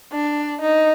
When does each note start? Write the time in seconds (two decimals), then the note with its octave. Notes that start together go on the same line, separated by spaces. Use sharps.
0.12 D4
0.61 D#4